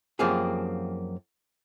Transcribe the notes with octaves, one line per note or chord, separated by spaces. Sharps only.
F#2 F3 A#3 C4 G4 G#4